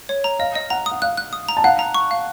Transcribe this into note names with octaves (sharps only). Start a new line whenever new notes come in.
C#5
A#5
D#5 F5
D#5
F#5 A#5
D#6
F#5
F5 F#6
F#6
D#6
A#5
A5
F5 F#5
A#5
C#6
F5